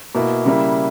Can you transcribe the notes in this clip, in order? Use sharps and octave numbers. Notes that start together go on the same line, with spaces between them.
B2 A#3 E4
C#3 G3 A#3 E4